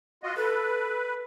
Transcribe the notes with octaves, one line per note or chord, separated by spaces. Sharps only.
F4 F#4 D#5
A4 B4